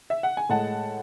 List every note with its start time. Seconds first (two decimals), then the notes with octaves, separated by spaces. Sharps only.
0.10 E5
0.23 F#5
0.37 G#5
0.49 A2 G#3 F#5 A5